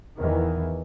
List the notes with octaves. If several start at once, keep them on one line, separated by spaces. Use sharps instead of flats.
E2 D#3 E3